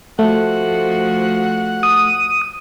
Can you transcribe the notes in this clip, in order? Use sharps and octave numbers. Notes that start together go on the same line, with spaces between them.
F3 A3 F#4 F#5
D#6